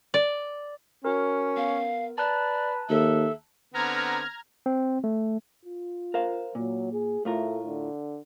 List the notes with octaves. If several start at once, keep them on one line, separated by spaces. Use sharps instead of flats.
D5
C#4 F#4 A#4
B3 A#4 F5
B4 D5 A5 A#5 F#6
D#2 A4 E5
D3 B3 C4 A#5 F6 G#6
C4
A3
F4
A#4 C5 F5
A#2 F#3
G#4
A2 A3 F4 A#4
D3